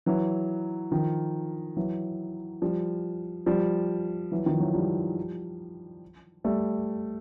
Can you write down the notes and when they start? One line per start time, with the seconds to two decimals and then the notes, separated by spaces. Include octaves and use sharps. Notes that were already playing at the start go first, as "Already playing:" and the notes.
0.06 E3 F#3
0.92 D#3 F3
1.76 E3 F#3
2.62 F3 G3
3.46 F3 G3
4.32 E3 F#3
4.46 D#3 F3
4.60 E3 F#3
4.74 F3 G3
6.44 G3 A3